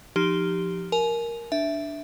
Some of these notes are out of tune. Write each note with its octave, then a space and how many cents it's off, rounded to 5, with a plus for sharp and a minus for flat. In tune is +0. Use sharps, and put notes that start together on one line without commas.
F3 -5 D#4 +0 G4 -5
A#4 +0 G#5 +40
D4 +0 E5 +0